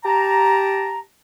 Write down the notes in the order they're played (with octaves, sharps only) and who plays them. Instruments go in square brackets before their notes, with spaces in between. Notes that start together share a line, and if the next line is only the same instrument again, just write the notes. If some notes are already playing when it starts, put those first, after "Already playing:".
[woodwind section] G4 A5 A#5